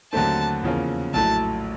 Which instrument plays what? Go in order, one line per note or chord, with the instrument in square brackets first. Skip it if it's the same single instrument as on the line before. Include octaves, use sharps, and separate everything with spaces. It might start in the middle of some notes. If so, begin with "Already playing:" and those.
[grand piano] D#2 D3 F#3 A3 C4 [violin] A5
[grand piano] E2 C#3 F3 A#3 C#4
[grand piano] A#1 A2 F#3 A3 [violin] A5